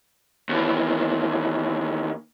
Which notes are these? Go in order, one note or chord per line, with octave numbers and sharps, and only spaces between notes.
D#2 E3